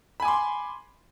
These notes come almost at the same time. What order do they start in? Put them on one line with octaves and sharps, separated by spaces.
B5 G#5 D6 C6